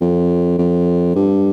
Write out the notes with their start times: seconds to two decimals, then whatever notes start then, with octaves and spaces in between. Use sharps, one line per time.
0.01 F2
0.58 F2
1.15 G2